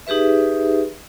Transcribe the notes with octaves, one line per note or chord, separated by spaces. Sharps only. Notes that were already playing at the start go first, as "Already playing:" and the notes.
D#4 G4 G#4 B4 E5